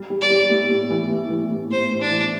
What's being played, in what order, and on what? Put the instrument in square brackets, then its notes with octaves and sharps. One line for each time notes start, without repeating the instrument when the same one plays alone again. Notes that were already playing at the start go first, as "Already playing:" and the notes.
Already playing: [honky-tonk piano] G3
G3
[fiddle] D5
[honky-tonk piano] G3
A2
A2
E3
A2
E3
A2
[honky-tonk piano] A2 [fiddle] C5
[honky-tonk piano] A2
[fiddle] D4
[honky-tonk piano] E3